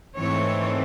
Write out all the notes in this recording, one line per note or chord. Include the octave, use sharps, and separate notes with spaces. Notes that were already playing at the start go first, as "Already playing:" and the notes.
G#2 E3 A3 C4 E4 C#5